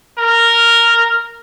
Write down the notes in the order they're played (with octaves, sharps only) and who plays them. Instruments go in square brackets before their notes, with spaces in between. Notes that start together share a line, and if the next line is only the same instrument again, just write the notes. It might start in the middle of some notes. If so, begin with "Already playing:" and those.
[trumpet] A#4